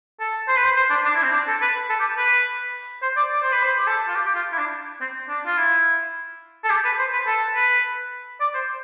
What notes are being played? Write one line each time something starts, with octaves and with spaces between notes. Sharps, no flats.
A4
C5
B4
C5
C5
D4
D4
E4
C4
D4
A4
B4
B4
A4
G4
B4
C5
D5
D5
C5
B4
C5
G4
A4
F4
G4
G4
F4
E4
D4
C4
D4
F4
E4
A4
G4
B4
C5
B4
A4
B4
D5
C5